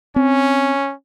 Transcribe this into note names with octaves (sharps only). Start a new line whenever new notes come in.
C4 C#4